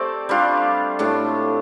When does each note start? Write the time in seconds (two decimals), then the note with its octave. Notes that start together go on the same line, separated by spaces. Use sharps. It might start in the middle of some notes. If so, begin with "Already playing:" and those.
Already playing: A3 C4 G4 D5
0.29 G3 D4 F4
0.99 A2 A3 D4 G4